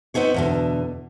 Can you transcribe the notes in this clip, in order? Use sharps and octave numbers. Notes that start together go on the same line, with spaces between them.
B3 C4 D#4 G#4 C#5
E2 B2 D3